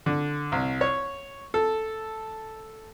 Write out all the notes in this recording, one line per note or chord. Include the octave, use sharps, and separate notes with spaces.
D3
C2
C#5
A4